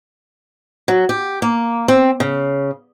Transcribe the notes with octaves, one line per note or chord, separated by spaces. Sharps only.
F#3
G4
A#3
C4
C#3